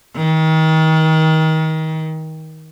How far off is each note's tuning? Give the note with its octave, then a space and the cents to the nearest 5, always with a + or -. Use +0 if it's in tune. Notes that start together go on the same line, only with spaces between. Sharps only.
D#3 +30